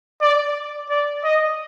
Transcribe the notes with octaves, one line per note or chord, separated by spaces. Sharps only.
D5
D5
D#5